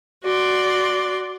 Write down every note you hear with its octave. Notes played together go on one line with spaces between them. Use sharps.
F#4 D5 C6